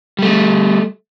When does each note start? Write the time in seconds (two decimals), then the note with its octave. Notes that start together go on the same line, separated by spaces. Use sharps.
0.19 G3 A3